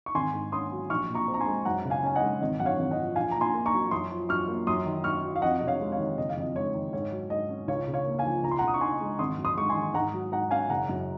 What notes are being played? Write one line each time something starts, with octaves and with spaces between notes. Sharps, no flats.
C#6
G#1 G#5 C6
G#2
C#4 C6 D#6
F#3
A#1 C#6 F6
A#2
A#5 C#6
C4
A#5
G#5 C6
G#3
F#2 F#5 A#5
C#3
F5 G#5
C#4 G#5
D#5 F#5
G#3
G#1 D#5
F#2 F#5
C#5 F5
G#1
D#5 F#5
F3
A#1 F5 G#5
A#2 A#5
G#5 C6
A#3
A#5 C#6
F#3
F#2 C6 D#6
F3
F#2 C#6 F6
A#3
F#2 C6 D#6
D#3
F#2 C#6 F6
F#3
F5
F2 D#5 F#5
C3 D#5
C#5 F5
G#3
C#5 F5
D#3
F#1 D#5
F5
F2 D#5
G#3 C#5
D#3
G#2 C#5
F#3
G#2 D#5
C#4
C#2 C#5 F5
C#3
C#5 F5
A#3
F5 G#5
F3
C#2 A#5
C6
F#5 A#5
C#3
D#6
C#6
D#4 G#5 C6
G#3
G#1 C6 D#6
F#2
C6 D#6
G#3 C#6
G#5 C6
D#3
G#2 F#5 A#5
F#3
G#2 F#5 A#5
C#4 F5 G#5
F#1 F#5 A#5
F#2